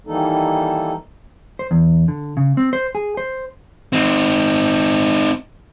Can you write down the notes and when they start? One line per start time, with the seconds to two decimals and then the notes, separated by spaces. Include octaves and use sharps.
0.07 D#3 E3 G3 A#3 D#4 A4
1.59 C5
1.71 E2
2.08 D3
2.37 C#3
2.57 C4
2.73 C5
2.95 G#4
3.17 C5
3.93 C4 D#4